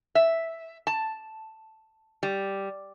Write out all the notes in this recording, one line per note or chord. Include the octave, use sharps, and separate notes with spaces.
E5
A5
G3